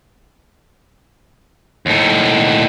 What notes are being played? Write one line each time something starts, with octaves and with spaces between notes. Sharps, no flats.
D#2 A2